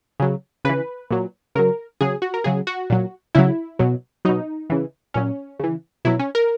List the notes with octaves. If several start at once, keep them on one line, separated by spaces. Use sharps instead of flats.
C#3 F#3
C#3 E3 B4
A#2 F#3
C#3 F#3 A#4
C#3 F#3 G#4
F#4
A#4
C#3 F#3 G#4
F#4
A#2 F#3
C#3 F#3 E4
B2 F#3
B2 F#3 D#4
C#3 E3
A#2 F#3 C#4
C#3 E3
B2 F#3 E4
C#4
A#4